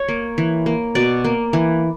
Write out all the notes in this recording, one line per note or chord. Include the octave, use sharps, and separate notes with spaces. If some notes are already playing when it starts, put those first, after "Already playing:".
Already playing: C#5
A#3
E3
A#3
B2 D5
A#3
E3